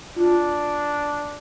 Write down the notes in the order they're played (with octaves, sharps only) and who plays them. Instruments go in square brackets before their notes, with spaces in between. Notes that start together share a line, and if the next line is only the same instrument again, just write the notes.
[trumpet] D4 [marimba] F4